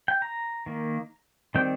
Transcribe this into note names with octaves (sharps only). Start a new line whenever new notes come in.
G5
A#5
D#3 A#3
D#3 G3 C4 G5